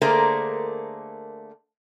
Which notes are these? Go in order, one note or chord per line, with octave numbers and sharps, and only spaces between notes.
D3 A3 A#3 G#4 A#4 C5